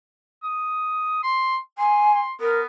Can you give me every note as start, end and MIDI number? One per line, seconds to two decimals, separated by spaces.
0.43 1.20 87
1.23 1.56 84
1.78 2.20 80
1.78 2.09 84
2.15 2.32 84
2.40 2.66 59
2.40 2.61 70